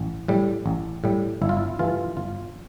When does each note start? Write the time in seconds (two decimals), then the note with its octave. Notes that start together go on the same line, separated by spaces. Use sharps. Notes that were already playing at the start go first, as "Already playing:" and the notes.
Already playing: A1
0.28 A2 G3
0.66 A1
1.04 A2 G3
1.42 G1 E4
1.49 F4
1.57 E4
1.79 G2 E3 A3 F4
2.17 G1 F4